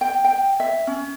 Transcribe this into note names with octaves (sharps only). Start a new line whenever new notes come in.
G5
G5
E5
C#4